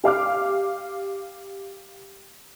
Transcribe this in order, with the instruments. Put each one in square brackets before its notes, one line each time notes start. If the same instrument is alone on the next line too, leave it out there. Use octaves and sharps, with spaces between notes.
[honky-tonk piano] G4 F5 D6 F6